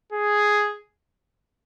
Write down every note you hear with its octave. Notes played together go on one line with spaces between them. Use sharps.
G#4